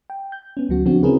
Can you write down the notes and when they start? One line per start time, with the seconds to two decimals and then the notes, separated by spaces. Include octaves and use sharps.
0.10 G5
0.32 G6
0.57 B3 C#4
0.69 D2 F#3 F#4
0.85 C#3 F3 B3 C4 D4 F#4
1.03 C4 C#4 E4 G#4 A#4 B4